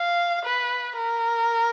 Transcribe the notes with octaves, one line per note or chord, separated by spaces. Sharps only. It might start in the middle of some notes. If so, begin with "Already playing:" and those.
Already playing: F5
B4
A#4